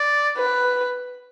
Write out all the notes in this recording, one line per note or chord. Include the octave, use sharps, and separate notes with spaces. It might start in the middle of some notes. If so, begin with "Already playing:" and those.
Already playing: D5
B4